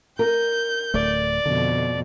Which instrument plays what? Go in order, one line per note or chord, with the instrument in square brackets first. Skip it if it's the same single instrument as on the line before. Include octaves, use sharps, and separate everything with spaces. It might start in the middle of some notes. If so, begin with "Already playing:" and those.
[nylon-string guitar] A#4 [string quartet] G6
[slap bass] D1 A3 [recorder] D5
[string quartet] F2 B2 [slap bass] D3